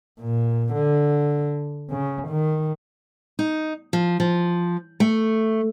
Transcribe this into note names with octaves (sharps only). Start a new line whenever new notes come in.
A#2
D3
C#3
D#3
D#4
F3
F3
A3